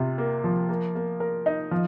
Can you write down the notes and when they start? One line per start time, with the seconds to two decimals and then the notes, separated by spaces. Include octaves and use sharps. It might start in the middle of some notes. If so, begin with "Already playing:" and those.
Already playing: C3 F4
0.18 A#3
0.44 F3
0.69 A#3
0.95 A#3
1.20 A#4
1.46 D#4
1.71 F3